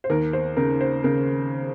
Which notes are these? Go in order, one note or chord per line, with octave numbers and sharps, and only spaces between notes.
C5
D#2 A#4
C5
C#3 A#4
C5
C#3 A#4